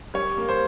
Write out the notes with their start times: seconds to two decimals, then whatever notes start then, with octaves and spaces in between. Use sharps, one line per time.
0.14 G3 C#5
0.38 A#3
0.49 C5